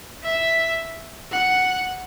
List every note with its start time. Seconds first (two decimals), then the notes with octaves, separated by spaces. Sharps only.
0.23 E5
1.32 F#5